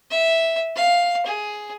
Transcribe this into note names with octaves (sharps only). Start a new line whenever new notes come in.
E5
F5
G#4